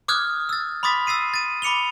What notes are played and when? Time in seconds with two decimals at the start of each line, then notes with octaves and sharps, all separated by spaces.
0.08 D6 D#6 F6 F#6 G#6
0.49 E6 A6
0.83 B5 C6 D6 D#6 A6 B6
1.07 E6 A6 C7 D#7
1.34 A6 D#7
1.62 B5 D6 C#7 F7 G7